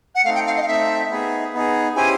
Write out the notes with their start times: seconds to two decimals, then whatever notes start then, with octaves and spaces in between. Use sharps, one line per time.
0.15 F#5
0.24 A3 C4 D#4 F5
0.35 G5
0.46 F5
0.57 D#5
0.62 F5
0.68 A3 C4 D#4 E5
1.10 B3 D#4 G#4
1.54 B3 D#4 G#4
1.96 C#4 E4 G4 C5 G#5